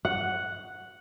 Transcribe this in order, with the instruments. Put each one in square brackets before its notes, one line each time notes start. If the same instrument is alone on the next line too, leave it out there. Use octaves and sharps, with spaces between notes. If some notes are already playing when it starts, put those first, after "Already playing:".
[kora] F#5